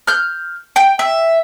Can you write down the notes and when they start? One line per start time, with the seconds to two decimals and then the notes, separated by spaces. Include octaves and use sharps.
0.07 F6 G6
0.76 G5
0.99 E5